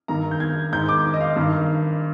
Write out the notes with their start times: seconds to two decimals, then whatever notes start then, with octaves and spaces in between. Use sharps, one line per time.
0.08 G2 D#3 A#5
0.31 G6
0.40 G#6
0.72 G#2 D#3 G6
0.89 D6
1.05 D6
1.14 D#5
1.21 F5
1.36 G2 D#3